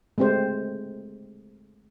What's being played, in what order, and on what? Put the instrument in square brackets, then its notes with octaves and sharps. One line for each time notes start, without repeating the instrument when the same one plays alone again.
[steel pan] G#3 A3 C4 G4 C5